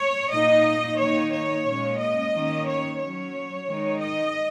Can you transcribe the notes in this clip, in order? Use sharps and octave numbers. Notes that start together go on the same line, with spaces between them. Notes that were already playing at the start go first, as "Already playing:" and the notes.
Already playing: C#5
A#2 A#3 D#4 D#5
D#3 A#3 D#4 C#5
C#5
A#2 G#3 C#4
D#5
D#3 A#3 C#4
C#5
F#3 C#4 C#5
D#3 G#3 D#4
D#5